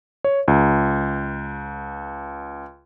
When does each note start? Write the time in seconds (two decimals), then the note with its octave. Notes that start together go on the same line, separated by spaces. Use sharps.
0.24 C#5
0.48 C#2